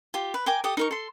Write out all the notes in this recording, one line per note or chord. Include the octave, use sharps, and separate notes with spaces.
F4 G4
B4
A#4 G5 G#5 D6
G4 A4 D6 D#6
D#4 A#4 C#6
A4 C6